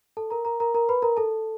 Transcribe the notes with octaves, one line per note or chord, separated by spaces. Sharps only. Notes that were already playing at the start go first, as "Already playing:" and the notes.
A4 A5
A#4 A#5
A#4 A#5
A#4 A#5
A#4 A#5
B4 B5
A#4 A#5
A4 A5